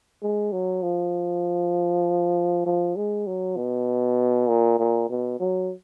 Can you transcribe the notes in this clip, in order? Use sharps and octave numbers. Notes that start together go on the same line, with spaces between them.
G#3
F#3
F3
F3
G#3
F#3
B2
A#2
A#2
B2
F#3